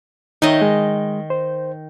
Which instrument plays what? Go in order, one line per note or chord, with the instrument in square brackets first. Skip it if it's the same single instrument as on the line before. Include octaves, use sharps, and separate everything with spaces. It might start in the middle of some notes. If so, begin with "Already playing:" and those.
[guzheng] D#3 D#5 [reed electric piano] D#4 C#5 E5
[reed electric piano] G#3
C5